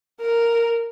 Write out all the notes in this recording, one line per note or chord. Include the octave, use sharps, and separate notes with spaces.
A#4